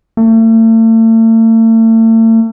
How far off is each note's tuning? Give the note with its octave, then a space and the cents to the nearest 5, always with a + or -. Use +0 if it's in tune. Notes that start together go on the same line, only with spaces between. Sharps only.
A3 +40